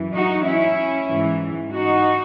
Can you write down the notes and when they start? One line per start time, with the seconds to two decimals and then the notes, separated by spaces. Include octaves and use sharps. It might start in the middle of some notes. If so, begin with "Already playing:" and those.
Already playing: F#2 E3
0.14 D#4 F#4
0.46 C#4 E4
1.09 G#2 E3
1.72 D#4 F#4